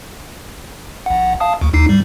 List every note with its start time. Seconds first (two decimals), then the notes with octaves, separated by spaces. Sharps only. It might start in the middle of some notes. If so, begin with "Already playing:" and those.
1.06 A#1 F#5
1.40 F5 A5 D#6
1.61 D2
1.73 D#2 D#4 C7
1.89 G#2 G3